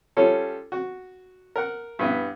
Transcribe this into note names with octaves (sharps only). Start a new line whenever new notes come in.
G3 C#4 F4 A4 C#5
F#4
A#4 F#5
G2 B3 E4